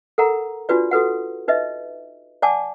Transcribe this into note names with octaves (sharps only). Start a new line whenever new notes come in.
A4 A#4 F#5 A#5
D4 F4 F#4 B4 D5
F#4 A4 B4 F#5
D#4 B4 D#5 E5
D5 F#5 G#5 A5 D6